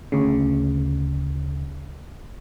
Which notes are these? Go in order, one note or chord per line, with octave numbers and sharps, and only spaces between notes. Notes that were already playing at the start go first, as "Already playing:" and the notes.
D2 C#3